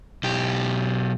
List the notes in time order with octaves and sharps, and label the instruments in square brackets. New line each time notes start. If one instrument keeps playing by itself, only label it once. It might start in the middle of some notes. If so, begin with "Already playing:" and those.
[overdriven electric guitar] B1 G4